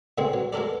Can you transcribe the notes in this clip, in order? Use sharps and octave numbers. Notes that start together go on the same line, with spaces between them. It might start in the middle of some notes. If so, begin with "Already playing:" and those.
A#2 D3 G#3 B3 C4 G#4
F#3
G#3 B3 A4 A#4 D5